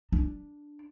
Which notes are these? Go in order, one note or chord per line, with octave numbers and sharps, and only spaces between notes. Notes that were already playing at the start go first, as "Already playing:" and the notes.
D4